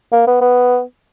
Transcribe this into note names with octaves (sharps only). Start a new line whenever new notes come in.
A#3
B3
B3